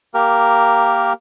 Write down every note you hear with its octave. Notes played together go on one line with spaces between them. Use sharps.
A#3 G4 A#4